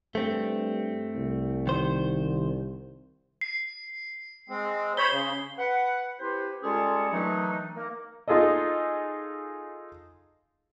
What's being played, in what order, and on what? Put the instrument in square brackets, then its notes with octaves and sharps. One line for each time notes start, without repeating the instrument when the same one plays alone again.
[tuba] G2 [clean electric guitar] A3 C4
[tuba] C2
[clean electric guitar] D#3 C5
[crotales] C7
[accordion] G#3 C4
[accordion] C5 C#5 B5 [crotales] G7
[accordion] C#3
[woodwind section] B4 F#5
C4 E4 G4 B4 C5
G3 G#3 C#4 F4 G#4 A4
D#3 E3 F#3 A3 D4 D#4
A#3 A#4
[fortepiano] D#4 F4 G#4 A4 D#5